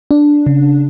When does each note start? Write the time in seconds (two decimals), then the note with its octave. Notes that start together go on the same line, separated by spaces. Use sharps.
0.11 D4
0.47 C#3